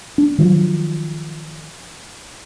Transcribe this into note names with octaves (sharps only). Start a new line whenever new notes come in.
D4
D#3 F3 F#3